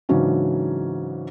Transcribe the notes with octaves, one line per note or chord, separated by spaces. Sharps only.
G#2 C#3 E3 F#3 C#4 D4